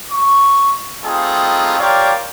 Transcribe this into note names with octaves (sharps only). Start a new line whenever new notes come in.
C#6
G3 A3 C4 D#4 F4 G#4
F4 G4 A#4 C#5 D5 F5